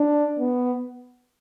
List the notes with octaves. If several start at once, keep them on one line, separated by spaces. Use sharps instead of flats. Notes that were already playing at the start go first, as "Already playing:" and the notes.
Already playing: D4
B3